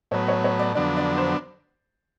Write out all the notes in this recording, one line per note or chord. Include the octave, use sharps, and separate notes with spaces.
A2 F#3 B3 C#5
C#5
C#5
D5
F2 D3 F#3 B3 D4 D5
D5
C5